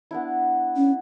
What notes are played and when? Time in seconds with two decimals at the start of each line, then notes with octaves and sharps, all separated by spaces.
0.11 B3 D4 E4
0.77 C#4